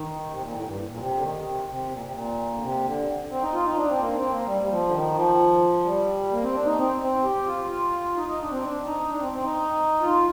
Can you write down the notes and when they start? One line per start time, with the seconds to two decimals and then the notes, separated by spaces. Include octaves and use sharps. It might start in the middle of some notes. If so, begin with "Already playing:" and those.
Already playing: D#3
0.30 C3
0.41 A#2
0.53 A2
0.65 G2
0.91 A#2
0.99 C3
1.16 D3
1.22 D#3
1.45 C3
1.68 C3
1.91 A#2
2.02 C3
2.12 A#2
2.54 D3
2.61 C3
2.84 D3
3.31 C4
3.42 D#4
3.53 F4
3.65 D#4
3.77 D4
3.88 C4
4.00 A#3
4.11 D4
4.15 C4
4.31 A#3
4.46 G3
4.62 G3
4.69 F3
4.87 D3
4.92 D#3
5.15 F3
5.85 G3
6.32 A#3
6.43 C4
6.54 D4
6.66 D#4
6.77 C4
7.01 C4
7.24 G4
7.47 F4
7.70 F4
8.17 D#4
8.28 D#4
8.41 D4
8.51 C4
8.62 D4
8.86 D#4
9.09 D4
9.20 C4
9.32 C4
9.44 D#4
10.01 F4